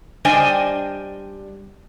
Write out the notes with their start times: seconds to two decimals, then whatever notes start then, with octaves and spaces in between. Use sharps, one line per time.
0.25 G3 D4 C5 D#5 G5 G#5